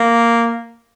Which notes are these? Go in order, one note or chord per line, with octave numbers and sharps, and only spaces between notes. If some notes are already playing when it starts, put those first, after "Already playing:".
Already playing: A#3